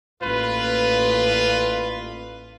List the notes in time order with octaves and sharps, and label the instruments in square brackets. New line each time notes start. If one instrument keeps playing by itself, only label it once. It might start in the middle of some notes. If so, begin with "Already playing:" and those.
[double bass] A1 A#3 [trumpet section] F4 B4